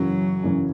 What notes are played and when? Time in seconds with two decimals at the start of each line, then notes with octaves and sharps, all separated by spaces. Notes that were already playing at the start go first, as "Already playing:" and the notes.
Already playing: F#2 C#3 E3 F#3 C#4
0.44 F#2 C#3 E3 C#4